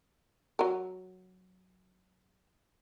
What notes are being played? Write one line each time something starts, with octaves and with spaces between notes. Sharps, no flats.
F#3 A#4